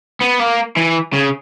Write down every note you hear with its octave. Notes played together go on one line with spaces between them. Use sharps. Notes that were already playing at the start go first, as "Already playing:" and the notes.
B3
A#3
E3
C#3